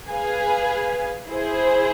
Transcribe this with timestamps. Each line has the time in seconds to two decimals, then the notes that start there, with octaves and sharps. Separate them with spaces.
0.09 G#4 B4 F5 G#5
1.28 E4 G#4 C5